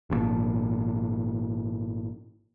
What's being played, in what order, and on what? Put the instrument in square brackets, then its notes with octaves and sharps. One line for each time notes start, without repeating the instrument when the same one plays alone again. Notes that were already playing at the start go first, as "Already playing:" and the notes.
[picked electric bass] G#1 G2 A#2 F3